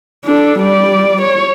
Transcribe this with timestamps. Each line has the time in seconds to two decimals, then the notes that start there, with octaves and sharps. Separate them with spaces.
0.25 D4 A4
0.59 G3 D5
1.21 C#5